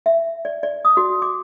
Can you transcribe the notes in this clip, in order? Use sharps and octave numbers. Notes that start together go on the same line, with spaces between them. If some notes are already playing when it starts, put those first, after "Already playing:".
E5
D5
D5
D#6
F#4
D6